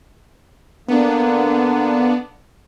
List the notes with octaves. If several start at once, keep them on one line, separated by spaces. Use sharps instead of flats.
D3 A#3 B3 D4